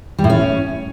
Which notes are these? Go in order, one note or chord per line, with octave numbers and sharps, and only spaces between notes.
G3
A2
C#4